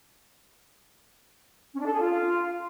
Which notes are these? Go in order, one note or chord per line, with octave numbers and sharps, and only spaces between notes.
C#4
D4
A4
G#4
F4